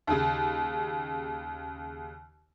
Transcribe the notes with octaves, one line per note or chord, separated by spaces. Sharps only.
D#2 C#3